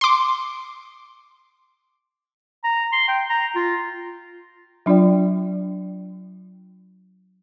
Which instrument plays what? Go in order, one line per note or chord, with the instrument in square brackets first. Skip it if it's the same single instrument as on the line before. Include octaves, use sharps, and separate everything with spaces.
[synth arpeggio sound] C6 D6
[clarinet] A#5
C6
G5
A#5
F4
[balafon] F#3 D4 F4 D5 G5